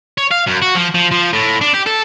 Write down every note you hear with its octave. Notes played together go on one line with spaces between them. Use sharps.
C#5
F5
F#2
F#4
F3
F3
F3
A2
D4
G4
A4